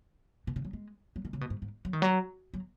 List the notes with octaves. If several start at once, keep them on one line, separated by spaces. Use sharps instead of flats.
B2
C#3
F#3
G#3
F#3
D#3
C#3
B2
G#2
G#2
F#3
D#3
F#3
F#3